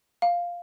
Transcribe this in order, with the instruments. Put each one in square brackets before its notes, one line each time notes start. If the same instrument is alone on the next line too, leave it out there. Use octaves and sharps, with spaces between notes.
[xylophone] F5